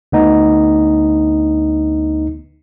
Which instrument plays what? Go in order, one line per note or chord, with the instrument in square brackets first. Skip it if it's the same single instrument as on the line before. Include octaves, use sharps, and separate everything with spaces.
[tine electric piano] D2 B3 D#4